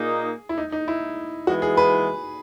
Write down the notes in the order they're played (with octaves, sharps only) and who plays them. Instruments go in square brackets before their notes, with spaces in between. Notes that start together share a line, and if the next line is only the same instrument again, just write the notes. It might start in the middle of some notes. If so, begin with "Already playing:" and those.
Already playing: [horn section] A#2 A#3 D#4 [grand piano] G#4
[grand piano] E4
D#4
D#4
E4
[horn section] E3 G#3 B3 [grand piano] F#4
[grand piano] G#4
B4